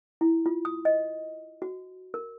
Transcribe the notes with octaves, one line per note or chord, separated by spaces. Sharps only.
E4
F4
D#6
D#5
F#4
A#4